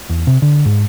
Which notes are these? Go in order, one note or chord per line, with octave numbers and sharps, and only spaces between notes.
E2
C3
D3
G#2